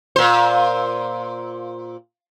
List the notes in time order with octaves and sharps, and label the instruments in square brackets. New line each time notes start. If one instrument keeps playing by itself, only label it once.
[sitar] A#2 C5